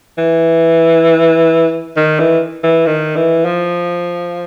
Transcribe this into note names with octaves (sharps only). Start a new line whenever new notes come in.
E3
D#3
E3
E3
D#3
E3
F3